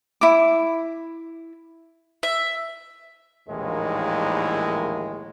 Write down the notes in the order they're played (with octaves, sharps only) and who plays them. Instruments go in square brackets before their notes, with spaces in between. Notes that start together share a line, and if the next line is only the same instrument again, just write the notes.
[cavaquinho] E4 D6
[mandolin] E5
[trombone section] A#1 D#2 A2 D#3 E3 G#3